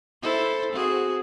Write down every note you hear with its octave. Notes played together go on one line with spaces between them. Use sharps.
E4 A4 C5
C4 F#4 G#4